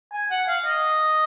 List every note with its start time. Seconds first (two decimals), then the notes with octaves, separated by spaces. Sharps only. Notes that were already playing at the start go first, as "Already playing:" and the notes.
0.13 G#5
0.31 F#5
0.48 F5
0.66 D#5